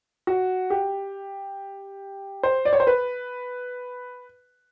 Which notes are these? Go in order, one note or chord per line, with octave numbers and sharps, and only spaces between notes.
F#4
G4
C5
D5
C#5
C5
B4